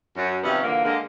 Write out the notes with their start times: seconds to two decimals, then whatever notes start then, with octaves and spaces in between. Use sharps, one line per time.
0.17 F#2
0.43 C3 D#3 F3 G3 B3 C#4
0.64 A#2 D3 E3 A#3
0.84 D3 G#3 A#3